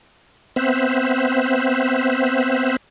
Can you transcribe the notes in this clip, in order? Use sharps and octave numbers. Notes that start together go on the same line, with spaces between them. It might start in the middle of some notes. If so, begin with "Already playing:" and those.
B3 C4 C5 E5 F#6